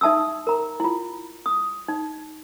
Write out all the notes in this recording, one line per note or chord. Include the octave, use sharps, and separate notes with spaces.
D#4 E5 A5 D#6 E6
A#4 A#5
E4 F4
D#6
D#4